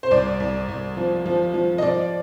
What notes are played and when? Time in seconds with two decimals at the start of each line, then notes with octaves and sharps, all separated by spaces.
0.03 C5
0.11 C2 D5
0.40 C2
0.68 C2
0.97 F3
1.26 F3
1.54 F3
1.78 D#5
1.82 F3 D5